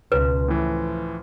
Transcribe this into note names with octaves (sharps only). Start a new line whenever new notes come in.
C#2 B2 B4
A2 E3 F3